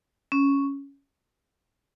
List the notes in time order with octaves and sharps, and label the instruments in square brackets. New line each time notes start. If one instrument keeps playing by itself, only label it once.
[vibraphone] C#4